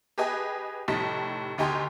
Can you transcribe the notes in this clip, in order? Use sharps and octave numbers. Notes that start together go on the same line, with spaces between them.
G4 G#4 B4 D#5 G#5
F1 A2 G3 D#4 A5 B6
D2 D#4 G4 G#5 C6